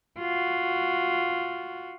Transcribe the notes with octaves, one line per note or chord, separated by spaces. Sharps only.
F4 F#4